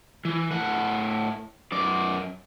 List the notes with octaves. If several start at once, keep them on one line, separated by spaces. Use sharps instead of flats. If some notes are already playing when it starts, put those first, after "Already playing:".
E3
A2 F#5
F#2 D5